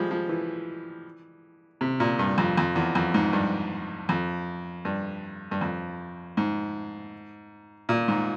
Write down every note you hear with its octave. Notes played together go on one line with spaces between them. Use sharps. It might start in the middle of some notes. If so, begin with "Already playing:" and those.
Already playing: F3 G3 G#3
F3
E3
C3
A#2
G2
F2
F2
E2
F2
G#2
G2
F2
G2
G2
F2
G#2
A#2
G#2